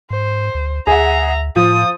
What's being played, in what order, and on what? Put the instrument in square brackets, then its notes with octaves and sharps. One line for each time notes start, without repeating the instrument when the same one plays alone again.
[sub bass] G#2 [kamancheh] C5
[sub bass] D2
[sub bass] D2 [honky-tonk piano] G#4 F#5 [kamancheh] E5 A#5
[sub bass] A2 [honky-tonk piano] F3 [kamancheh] D#6